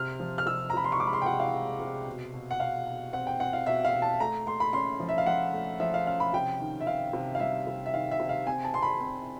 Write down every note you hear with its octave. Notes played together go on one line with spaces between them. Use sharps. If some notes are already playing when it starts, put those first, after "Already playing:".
Already playing: C3 F6
F3
F6
C3 E6
A#5
C3 B5
C6
C#6
G#3 D6
B5
C6
G5
C3 F#5
F5
G#3
C3
B2
B2
F#5
B2 F5
B2
C4 F#5
G5
C4 F#5
F5
B2 E5
F5
B2
A5
A3 A#5
A3 C6
B5
C#4 C6
F3
E5
F5
F3 F#5
A3
F3 E5
F5
C#4 F5
B5
C3 G5
D#3
E5
D#3 F5
C3
F5
G3 E5
C3
E5
D#3 F5
E5
C3
F5
C4 G#5
A5
C4 C6
B5
C4